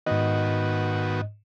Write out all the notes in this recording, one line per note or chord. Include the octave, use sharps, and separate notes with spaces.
G#2 D#3 B3 F#4 D#5